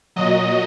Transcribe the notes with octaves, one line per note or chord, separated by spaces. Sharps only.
A#2 F#3 D#5